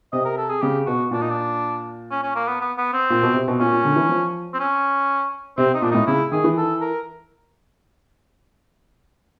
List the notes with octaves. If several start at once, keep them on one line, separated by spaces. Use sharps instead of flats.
C3 D#5
A#4
A4
G#4
C#3 G4
B2 F#4
A#2 D4
D#4
D4
C#4
C#4
A#3
B3
B3
B3
C4
A#2
B2
C3
B2
A#2 C#4
A#2
D3
E3
F3
C4
C#4
C3 C4
D#4
A#2 D4
A2 D#4
C#3 E4
D#3 G#4
E3
A4
A#4